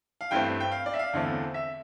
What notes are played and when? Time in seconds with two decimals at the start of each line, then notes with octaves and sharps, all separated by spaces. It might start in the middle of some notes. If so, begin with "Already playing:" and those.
0.21 F5
0.31 G2 E3 A3 C4 G5
0.60 G5
0.72 F5
0.86 D5
0.94 E5
0.99 F5
1.13 E2 D3 A3 C4
1.54 E5